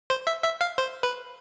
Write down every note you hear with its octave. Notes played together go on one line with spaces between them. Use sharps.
C5
E5
E5
F5
C5
B4